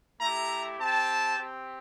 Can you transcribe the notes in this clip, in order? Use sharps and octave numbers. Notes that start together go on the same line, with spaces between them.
A3 E4 G4 A#5
C4 G4 A5
C4 G4